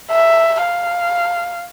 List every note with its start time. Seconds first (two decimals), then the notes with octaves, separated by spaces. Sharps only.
0.11 E5
0.62 F5